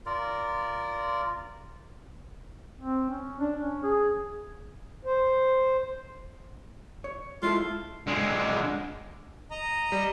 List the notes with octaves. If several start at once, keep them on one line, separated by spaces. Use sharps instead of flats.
F4 A#4 D5
C4
C#4
D4
C#4
G#4
C5
C#5
G#3 E4 F4 A4
D3 G#3
D#5 A#5
G3